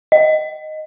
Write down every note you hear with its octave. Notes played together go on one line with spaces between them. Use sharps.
D#5